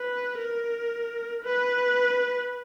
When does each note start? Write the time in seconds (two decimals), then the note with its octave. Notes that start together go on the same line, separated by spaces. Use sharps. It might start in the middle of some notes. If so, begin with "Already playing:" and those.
Already playing: B4
0.39 A#4
1.44 B4